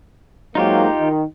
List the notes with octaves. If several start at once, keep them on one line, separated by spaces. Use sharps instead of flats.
G#2 F#3 A#3 D#4 F4 G4
D#3